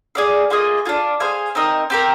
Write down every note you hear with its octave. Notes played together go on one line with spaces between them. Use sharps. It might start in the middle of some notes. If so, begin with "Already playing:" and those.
G#4 D5 F5
A#3 F4 G#4 D#5
D4 F4 G#4
G#4 C5 F5 G#5
C4 D#4 A#4 D#5
C4 G4 A#4